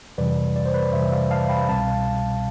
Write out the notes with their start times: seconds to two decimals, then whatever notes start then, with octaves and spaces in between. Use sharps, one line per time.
0.18 F2 C3 E3 G3 B4 D5
0.56 D5
0.66 C5
0.74 B4 D5
0.93 F2 C3 E3 G3 C5 E5
1.12 D5 F5
1.31 F5 A5
1.49 G5 B5
1.69 C2 B2 G3 C4 F5 A5